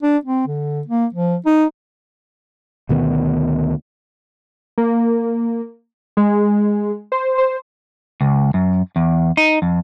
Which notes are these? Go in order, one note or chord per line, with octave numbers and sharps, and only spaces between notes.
D4
C4
D3
A#3
F3
D#4
D2 B2 D#3 B3
A#3
G#3
C5
C5
C#2
F#2
E2
D#4
F2